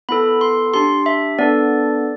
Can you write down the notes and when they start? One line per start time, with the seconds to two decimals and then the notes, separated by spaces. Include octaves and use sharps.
0.09 B3 E4 A4 B5
0.41 C6
0.74 D4 G4 C6
1.06 E5
1.39 B3 D4 A4 D5